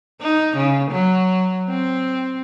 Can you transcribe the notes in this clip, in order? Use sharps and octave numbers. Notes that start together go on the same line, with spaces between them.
D#4
C#3
F#3
C4